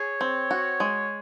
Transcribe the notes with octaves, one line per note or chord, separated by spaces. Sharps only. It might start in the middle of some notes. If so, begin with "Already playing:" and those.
Already playing: G#4 C#5
C4
F#4
G#3